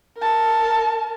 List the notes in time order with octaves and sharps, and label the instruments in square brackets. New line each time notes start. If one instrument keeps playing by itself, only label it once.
[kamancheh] A#4 A5